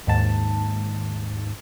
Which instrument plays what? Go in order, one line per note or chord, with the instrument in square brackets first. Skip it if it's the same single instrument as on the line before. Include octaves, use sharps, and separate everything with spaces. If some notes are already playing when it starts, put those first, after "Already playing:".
[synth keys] D#2 G#2 A5